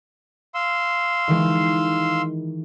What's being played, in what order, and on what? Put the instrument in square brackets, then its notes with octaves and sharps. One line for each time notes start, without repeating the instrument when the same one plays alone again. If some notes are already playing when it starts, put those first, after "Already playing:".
[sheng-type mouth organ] F5 C6 E6
[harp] D#3 E3 G#3